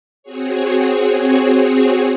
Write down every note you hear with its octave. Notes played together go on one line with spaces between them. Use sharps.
C4 F#4 G#4 C#5